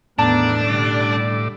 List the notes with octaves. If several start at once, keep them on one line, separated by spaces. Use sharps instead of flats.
E2 A2 D#3 B3 D4 D5 A5 A#5
B2 D3 G3 C#4